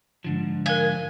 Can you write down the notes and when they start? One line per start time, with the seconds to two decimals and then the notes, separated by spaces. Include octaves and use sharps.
0.24 G#2 D3 F3
0.66 A#4 F5 G#5